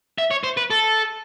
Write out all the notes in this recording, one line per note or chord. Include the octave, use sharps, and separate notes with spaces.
E5
C#5
C5
B4
A4